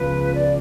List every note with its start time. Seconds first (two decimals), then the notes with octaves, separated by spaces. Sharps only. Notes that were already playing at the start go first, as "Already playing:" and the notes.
Already playing: C#2 C#3 F3 B3 B4
0.35 D5